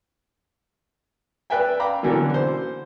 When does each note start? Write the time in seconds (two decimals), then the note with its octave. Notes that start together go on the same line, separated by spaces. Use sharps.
1.50 B4 D5 E5 G5 G#5
1.80 F5 G5 A#5 B5 D6
2.03 B2 D3 E3 F#3 A#3
2.34 C5